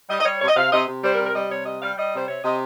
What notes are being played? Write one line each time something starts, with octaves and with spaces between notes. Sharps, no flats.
G3 D#5
D#5
G3 C#5
C3 C#5
D#5
C3 F5
C3 D#5
C3
G3 C5
A#4
C3
A#4
G3 D#5
C3 C#5
G3 D#5
G3 F5
G3 D#5
C3 C5
C3 C#5
C3 D#5